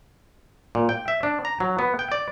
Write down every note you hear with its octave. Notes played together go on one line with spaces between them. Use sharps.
A#2
G5
E5
D4
A#5
F#3
B3
G5
D5